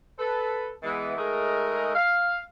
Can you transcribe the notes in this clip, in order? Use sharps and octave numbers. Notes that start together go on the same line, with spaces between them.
A4 B4
E3 G#3 B3
G#3 A3 D#4 G#4 A#4
F5